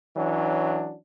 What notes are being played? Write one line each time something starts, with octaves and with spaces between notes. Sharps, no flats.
E3 F#3 C#4 D4